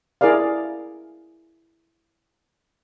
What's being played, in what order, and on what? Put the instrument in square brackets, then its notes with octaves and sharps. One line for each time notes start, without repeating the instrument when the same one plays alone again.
[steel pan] E4 G#4 A#4 D5 F5